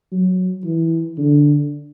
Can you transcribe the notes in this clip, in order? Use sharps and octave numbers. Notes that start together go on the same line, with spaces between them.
F#3
E3
D3